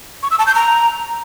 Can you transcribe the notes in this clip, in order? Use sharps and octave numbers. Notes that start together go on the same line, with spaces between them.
C#6
E6
A5
G6
A#5